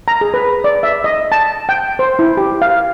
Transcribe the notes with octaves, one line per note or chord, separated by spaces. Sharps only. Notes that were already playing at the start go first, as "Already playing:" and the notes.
A#5
G#4
B4
D5
E5
D#5
A5
G5
C5
E4
G4
F5